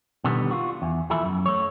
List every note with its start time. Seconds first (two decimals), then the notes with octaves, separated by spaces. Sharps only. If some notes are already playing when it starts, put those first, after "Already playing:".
0.24 B2 D3 D#3 G3 B3
0.51 F4 F#4
0.82 E2
1.10 D#2 E3 F3 A4 E5 B5
1.24 F#2
1.46 A3 C#5